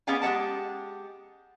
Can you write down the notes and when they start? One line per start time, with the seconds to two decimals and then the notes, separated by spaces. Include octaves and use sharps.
0.07 B3 C#4 G#4 D5 F5 G#5
0.22 G#3 G4 D5 F#5 A5